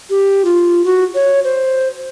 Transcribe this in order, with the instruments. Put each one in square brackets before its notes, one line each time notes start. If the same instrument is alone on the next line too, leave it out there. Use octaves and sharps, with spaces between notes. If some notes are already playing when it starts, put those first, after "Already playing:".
[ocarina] G4
F4
F#4
C#5
C5